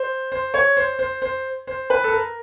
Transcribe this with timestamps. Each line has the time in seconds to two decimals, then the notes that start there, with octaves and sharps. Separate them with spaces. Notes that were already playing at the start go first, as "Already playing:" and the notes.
Already playing: C5
0.32 C5
0.54 C#5
0.77 C5
0.99 C5
1.22 C5
1.67 C5
1.90 B4
2.04 A4
2.12 A#4